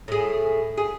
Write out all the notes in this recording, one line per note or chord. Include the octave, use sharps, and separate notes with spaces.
A2 G#4
G#4